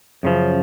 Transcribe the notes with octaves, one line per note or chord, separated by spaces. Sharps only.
F#2 C#3 F3